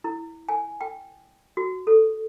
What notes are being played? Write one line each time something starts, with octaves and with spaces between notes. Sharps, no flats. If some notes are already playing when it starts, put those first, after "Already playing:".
E4
G#5
G5
F#4
A4